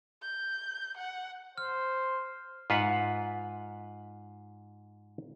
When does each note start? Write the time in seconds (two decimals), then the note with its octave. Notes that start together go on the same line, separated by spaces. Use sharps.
0.22 G6
0.97 F#5
1.58 C5 F6
2.70 G#2 F4 B4 E5 F#5